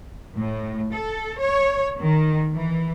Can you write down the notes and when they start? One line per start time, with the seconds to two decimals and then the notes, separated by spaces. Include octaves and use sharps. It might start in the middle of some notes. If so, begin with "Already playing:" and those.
0.37 A2
0.93 A4
1.39 C#5
2.00 D#3
2.55 E3